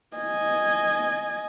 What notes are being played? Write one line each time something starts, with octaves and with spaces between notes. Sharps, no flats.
D#5 G#5